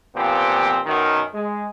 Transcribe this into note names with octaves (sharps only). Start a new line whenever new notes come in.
A#2 F3 B3 C4 G4
F#2 B2 D#3
G#3